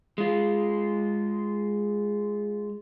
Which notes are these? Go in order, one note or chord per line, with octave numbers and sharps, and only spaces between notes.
G#3 F4